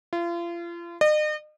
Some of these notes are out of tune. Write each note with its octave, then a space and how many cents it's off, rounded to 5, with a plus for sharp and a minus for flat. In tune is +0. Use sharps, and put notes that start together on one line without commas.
F4 -35
D#5 -40